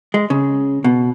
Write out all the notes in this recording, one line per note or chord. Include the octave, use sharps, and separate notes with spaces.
G#3
C#3
B2